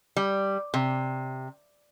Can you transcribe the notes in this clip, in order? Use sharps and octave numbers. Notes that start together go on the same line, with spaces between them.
G3
C3